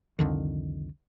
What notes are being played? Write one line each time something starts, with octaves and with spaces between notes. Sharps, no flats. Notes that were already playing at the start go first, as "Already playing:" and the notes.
C2 F2 D3 D#3